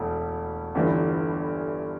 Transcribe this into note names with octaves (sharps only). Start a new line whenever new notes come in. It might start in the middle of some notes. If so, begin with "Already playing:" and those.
Already playing: E1 D2 A3
G1 G2 E3 A3